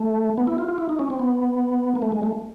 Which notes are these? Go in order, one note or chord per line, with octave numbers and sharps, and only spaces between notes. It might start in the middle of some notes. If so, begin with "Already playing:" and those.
Already playing: A3
B3
E4
F4
F4
E4
D#4
C#4
C4
B3
A#3
A3
G#3
A3